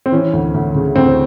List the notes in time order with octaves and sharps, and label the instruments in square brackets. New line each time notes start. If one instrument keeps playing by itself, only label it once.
[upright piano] C4
E3 C#4
D2
D2
C#3
D2 C4